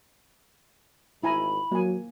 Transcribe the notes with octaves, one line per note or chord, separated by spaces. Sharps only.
G#1 E4 G#5 A#5 B5
F#3 A#3 G#5